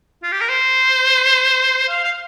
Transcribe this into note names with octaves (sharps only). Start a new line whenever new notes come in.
F4
G4
A#4
C5
F5
F5